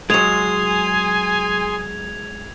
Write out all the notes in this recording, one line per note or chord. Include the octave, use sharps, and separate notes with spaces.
F#3 G#3 G#4 G#5 C6 G#6 F7